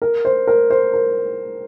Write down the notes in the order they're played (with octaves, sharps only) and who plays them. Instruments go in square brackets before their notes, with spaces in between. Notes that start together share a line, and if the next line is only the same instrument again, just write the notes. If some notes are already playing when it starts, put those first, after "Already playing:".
[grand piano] A#4
C5
A#4
C5
A#4